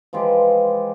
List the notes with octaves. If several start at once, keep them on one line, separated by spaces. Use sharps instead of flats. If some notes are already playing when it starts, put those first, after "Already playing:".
E3 F3 G#3 G4